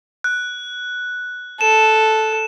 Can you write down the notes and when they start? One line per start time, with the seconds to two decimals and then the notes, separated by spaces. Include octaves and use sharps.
0.24 F#6
1.61 A4 E7